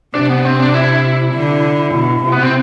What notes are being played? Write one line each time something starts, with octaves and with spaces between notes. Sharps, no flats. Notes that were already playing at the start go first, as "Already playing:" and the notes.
C3 D4
B3
C4
D4
E4
D3
B2
C3
B3
C4